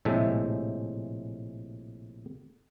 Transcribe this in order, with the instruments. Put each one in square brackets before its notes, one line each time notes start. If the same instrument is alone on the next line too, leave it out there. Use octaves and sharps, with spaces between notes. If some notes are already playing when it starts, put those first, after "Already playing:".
[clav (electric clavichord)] A#1 A2 C3 G#3 E5 A5